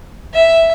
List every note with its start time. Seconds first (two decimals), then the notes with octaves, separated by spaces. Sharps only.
0.34 E5